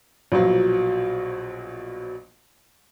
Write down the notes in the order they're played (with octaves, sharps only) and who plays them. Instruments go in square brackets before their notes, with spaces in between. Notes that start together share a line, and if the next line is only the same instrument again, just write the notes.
[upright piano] A#1 B2 F3 F#3